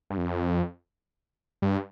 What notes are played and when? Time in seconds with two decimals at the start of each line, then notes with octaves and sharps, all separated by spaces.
0.10 G2
0.17 F2
1.62 G2